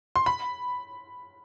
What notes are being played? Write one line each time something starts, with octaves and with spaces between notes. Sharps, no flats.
C6
B5